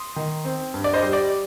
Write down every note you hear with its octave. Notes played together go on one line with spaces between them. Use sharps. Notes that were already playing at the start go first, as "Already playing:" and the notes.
Already playing: C6 D#6
D#3
C4
G2
D5
C5 D#5
G3
D5